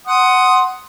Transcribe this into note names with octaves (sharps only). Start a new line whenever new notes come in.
F#5 C6 D#6